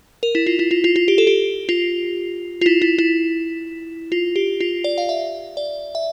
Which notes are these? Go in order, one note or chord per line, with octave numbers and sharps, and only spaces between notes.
A#4
E4
F4
E4
F4
F4
F4
G4
A4
G4
F4
F4
E4
E4
E4
F4
G4
F4
D5
F5
E5
D5
E5